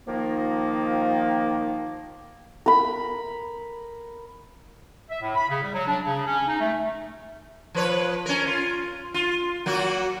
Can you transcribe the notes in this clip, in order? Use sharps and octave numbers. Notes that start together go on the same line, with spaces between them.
D#3 F3 A#3
A#4 B5
E5
A2
B5
C#3
G3
F#3
D4
C#3
C#4
D#4
A3
F3 B4 C#5
C#4 A#4
F4
F4
F#3 A#3 F#4